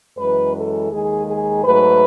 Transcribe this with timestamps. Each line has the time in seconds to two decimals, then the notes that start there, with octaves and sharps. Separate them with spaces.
0.17 F#2 E3 G#3 B4
0.54 A4
0.90 D#2 D#3 G#3 G#4
1.26 G#4
1.63 G#2 F#3 A3 B4